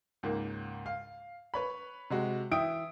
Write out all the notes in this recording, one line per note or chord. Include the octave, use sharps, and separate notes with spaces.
C#2 G#2 A#3
F5
B4 C#5 B5
C3 G#3 F#4
E3 E5 G5 D#6 D7